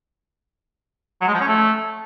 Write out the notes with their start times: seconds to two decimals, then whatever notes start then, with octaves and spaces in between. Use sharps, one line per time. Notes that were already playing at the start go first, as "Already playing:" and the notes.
1.21 F#3
1.27 G#3
1.34 F3
1.40 C#4
1.47 A3